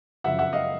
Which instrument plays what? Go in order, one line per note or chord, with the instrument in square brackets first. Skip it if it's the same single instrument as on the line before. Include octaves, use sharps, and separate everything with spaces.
[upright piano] F#2 C#3 F3 E5 F#5
E5 F#5
D#5 F5